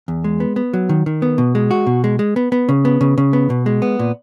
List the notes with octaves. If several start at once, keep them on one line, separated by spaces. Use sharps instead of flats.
E2
G#3
B3
B3
F#3
D#3
D#3
B3
B2
G#3
F#4
B2
G#3
G#3
B3
B3
C#3
B3
C#3
C#3
B3
B2
G#3
B3
A#2